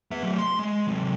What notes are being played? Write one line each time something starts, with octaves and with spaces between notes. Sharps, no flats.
B3 E5
F#3 A3
C6
G#3
C3 F#3